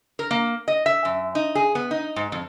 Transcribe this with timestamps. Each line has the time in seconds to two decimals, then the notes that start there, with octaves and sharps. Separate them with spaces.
0.19 A#4
0.31 A#3
0.68 D#5
0.86 E5
1.05 F#2
1.35 D#4
1.55 G#4
1.75 B3
1.91 D#4
2.16 G#2
2.32 F2